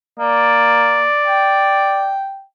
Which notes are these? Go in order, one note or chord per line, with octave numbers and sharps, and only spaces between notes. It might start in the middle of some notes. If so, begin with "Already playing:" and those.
A#3 D5
G5